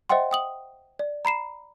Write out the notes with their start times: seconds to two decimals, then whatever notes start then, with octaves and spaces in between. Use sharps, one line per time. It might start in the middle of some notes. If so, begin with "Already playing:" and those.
0.09 C5 D#5 E5 F#5 G5 C6
0.31 G5 D#6 F#7
0.99 D5
1.25 A#5 B5 C7 E7